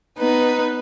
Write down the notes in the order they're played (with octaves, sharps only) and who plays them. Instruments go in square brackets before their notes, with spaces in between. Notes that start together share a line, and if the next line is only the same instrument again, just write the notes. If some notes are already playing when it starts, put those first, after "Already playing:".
[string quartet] B3 D#4 B4